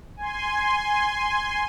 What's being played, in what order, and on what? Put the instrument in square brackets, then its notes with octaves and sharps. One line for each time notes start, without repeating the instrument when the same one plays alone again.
[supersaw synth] G#5 C6